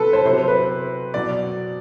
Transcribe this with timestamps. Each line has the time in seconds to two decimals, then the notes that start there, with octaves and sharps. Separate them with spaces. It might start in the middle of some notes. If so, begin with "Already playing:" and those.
Already playing: C3 F#3 A4 B4
0.13 C5
0.25 C3 F#3 C5
0.48 B4
1.14 B2 F#3 D5